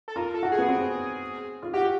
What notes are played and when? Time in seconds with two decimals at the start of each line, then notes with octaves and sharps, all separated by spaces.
0.08 A4
0.16 F4 A#4
0.34 A4
0.43 F#4
0.52 G#4
0.58 B3
0.69 C4
1.63 F4
1.73 F#4 G4